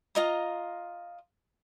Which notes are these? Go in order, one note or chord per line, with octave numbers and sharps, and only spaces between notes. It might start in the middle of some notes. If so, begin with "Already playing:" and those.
F4 D#5 A#5